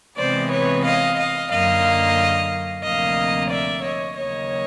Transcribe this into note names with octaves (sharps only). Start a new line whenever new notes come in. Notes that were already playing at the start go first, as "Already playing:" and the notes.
C3 E3 G#3 B3 C5 D5
B4 C#5
D#5 F5
D#5 F5
F#2 D3 F#3 A#3 D#5 F5
D2 C3 F3 A#3 D#5 F5
D5 E5
C#5 D#5
D#2 C#3 F#3 A#3 C#5 D#5